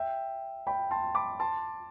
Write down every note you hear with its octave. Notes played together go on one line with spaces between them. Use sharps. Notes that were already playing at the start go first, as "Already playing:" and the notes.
Already playing: E5 G5
G5 B5
A5 C6
B5 D6
A5 C6